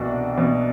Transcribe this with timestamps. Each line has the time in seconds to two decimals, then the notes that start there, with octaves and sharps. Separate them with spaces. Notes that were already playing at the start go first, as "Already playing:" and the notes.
Already playing: C2 B2 D4 F#4
0.38 B2